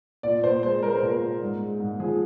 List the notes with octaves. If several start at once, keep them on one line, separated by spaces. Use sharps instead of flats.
A#2 D5
A#2 C5
G#3 C5
G#3 A#4
C5
A#2 A#4
A#2
G#2
G#3
G#2
F3 G#4